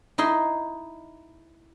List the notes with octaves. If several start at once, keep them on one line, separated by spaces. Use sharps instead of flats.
D#4 E4 D#5 C6